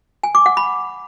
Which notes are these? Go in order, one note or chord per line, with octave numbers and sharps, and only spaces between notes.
G#5
D6
F#5
B5